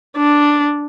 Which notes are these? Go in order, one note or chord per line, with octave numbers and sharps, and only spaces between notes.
D4